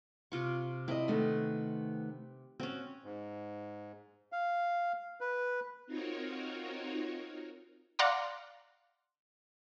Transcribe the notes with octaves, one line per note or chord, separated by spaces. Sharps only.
C3 F4 C#6
C4 E4 D#5
D#3 A3 B3
C4 C#4 F#4
G#2
F5
B4
C4 D#4 F4 F#4 A#4 C#5
D5 F5 F#5 A#5 C6 D6